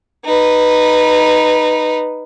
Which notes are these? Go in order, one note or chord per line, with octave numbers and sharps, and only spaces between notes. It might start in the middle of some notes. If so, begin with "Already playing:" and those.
D#4 B4